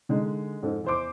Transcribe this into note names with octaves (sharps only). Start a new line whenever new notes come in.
D3 G#3 D#4
F2 G#2 A4
E2 C5 D6